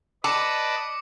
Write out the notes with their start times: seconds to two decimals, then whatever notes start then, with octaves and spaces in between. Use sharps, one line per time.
0.24 B4 D5 D#5 A5 D6 C#7